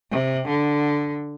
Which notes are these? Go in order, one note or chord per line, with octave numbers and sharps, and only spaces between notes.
C3
D3